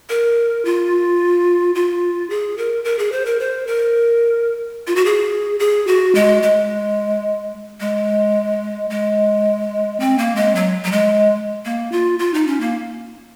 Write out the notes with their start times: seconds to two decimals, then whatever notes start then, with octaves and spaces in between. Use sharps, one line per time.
0.09 A#4
0.65 F4
1.75 F4
2.30 G#4
2.58 A#4
2.84 A#4
2.99 G#4
3.12 C5
3.26 A#4
3.40 C5
3.67 A#4
4.87 F4
4.96 F#4
5.05 G#4
5.59 G#4
5.87 F#4
6.15 G#3
6.43 G#3
7.80 G#3
8.90 G#3
10.00 C4
10.18 A#3
10.36 G#3
10.55 F#3
10.85 F#3
10.92 G#3
11.65 A#3
11.92 F4
12.19 F4
12.34 D#4
12.47 C#4
12.60 A#3